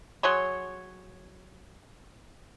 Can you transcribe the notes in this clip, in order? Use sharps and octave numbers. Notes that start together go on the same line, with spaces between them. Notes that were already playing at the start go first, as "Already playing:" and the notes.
F#3 G#4 C#5 C6